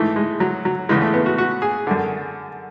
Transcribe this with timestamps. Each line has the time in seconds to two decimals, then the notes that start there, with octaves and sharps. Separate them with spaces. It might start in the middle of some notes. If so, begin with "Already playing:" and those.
Already playing: G#2 E3 A3
0.16 G#3
0.40 F#3
0.65 F#3
0.89 E2 C#3 E3 G#3
1.02 A3
1.14 B3
1.26 F#4
1.38 F#4
1.62 G#4
1.87 F#2 D3